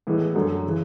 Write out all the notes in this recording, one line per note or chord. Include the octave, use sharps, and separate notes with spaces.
A2 E3 G#3 B3
F#2 D3 F#3 A3
C#3 E3